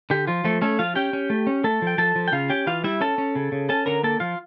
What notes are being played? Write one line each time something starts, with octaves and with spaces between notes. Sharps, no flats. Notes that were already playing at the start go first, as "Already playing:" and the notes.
D3 G4
F3 F4
F3 A3 A4
A3 C#4 A4
F3 F4 F5
C#4 G4 G5
C#4
A3
C#4
A3 A4 A5
F3 G5
F3 A4 A5
F3
G5
C#3 F4 F5
C#4 G4 G5
E3 F4 F5
G3 E4 E5
C#4 A4 A5
C#4
C#3
C#3
C#4 A4 A5
D3 A#4 A#5
A#3 A4 A5
F3 F4 F5